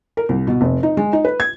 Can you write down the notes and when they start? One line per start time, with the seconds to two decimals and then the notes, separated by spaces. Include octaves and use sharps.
0.17 A#4
0.29 C2
0.47 B2
0.61 F1
0.83 D#4
0.97 G#3
1.13 D#4
1.25 B4
1.40 G#6